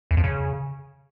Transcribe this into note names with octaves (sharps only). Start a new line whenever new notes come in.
E2
F2
C#3